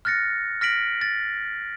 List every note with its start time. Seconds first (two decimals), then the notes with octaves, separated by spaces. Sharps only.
0.05 F6 F#6 A6 A#6 C#7
0.61 F6 A#6 B6 D7 F#7
1.01 A6